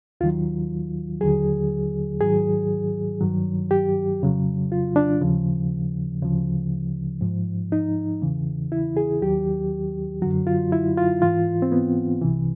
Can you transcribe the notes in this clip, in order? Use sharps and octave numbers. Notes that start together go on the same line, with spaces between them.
D#2 D#3 F#3 F4
D#2 D3 F#3 G#4
G#2 D#3 F#3 G#4
G2 D#3 F#3
G4
F2 C#3 F#3
F4
D4
D#2 C#3 F3
D2 C#3 F3
G#2 F3
D#4
E2 C#3 E3
E4
G#4
D#2 D#3 F#3 G4
F#2 D3 F#3 F#4
F4
E4
F4
G#2 E3 F4
C4
B3
C2 C3 E3